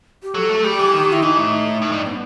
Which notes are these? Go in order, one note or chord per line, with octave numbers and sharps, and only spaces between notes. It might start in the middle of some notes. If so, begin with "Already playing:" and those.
G4
F#3 A4
A3
G3 G4
E3
D#3
E4
E3 D#4
A2
A2
G2
B3